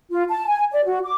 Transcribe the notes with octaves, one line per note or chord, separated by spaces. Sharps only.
F4
A5
G#5
D5
F#4
D6